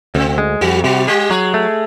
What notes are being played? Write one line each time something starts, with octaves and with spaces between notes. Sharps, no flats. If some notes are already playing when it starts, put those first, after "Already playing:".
D2 C3 C4
G#3
F2 F#3 F#4
C3 F#3 F#4
G3 G#3 G4
F#3 G#3 G#4
A3